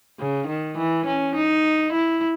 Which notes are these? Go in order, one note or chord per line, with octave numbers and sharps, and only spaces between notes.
C#3
D#3
E3
C#4
D#4
E4